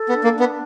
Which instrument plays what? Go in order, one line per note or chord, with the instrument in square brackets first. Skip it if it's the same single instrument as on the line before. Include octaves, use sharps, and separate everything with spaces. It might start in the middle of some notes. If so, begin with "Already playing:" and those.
Already playing: [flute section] A4
[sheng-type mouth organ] B3
[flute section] D4
[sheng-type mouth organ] A#3
[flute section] D4
[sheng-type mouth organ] B3